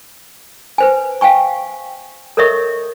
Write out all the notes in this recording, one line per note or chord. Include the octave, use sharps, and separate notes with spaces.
B4 C5 G#5
F5 G5 G#5 C#6
A4 A#4 C#5 D#5 E5 C#6